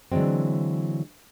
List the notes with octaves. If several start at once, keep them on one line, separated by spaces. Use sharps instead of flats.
D3 E3 F#3 G#3 C4